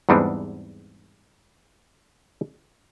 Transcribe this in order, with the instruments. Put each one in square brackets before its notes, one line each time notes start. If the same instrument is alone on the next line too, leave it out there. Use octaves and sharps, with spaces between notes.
[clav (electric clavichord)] E2 G#2 G3 B3 C4 D4